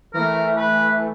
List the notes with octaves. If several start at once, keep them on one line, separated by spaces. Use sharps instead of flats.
E3 A3 A#4
B4